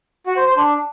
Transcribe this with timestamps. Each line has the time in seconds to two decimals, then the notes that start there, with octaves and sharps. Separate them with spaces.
0.27 F#4
0.37 C5
0.47 C5
0.57 D4